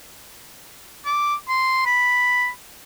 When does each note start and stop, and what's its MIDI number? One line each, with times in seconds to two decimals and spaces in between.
1.06 1.35 86
1.48 1.85 84
1.86 2.49 83